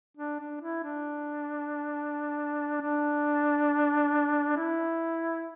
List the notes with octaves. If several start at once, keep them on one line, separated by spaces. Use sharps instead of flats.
D4
D4
E4
D4
D4
E4